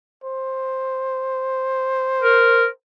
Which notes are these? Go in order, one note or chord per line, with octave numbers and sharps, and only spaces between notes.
C5
A#4